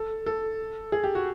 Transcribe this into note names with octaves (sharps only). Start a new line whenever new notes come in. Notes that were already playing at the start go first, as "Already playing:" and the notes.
Already playing: A4
A4
G#4
G4
F#4